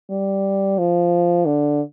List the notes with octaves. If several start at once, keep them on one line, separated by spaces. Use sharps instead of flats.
G3
F3
D3